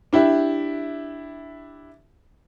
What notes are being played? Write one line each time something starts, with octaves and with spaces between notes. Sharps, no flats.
D4 E4 G4 E5